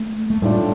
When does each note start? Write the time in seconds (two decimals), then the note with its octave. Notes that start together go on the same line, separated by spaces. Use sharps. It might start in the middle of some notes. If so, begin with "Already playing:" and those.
Already playing: A3
0.30 A3
0.42 A2 G3 A3 D4 F4 D5